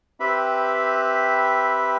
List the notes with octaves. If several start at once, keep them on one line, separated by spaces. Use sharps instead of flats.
C4 G4 B4 E5 B5